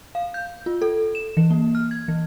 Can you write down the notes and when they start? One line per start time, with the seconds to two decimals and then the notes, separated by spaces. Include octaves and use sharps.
0.15 F5
0.34 G6
0.66 F4
0.82 A4
1.15 E7
1.37 E3
1.51 A#3
1.75 F6
1.91 G#6
2.08 E3